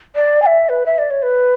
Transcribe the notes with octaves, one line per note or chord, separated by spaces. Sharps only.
D5
G#5
E5
B4
E5
D5
C#5
B4